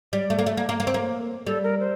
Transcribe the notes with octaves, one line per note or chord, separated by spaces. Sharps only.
G3 D5
A3
A#3
A3
A#3
A#3
A#3
C4
A#3
G3 A4
A#4
C5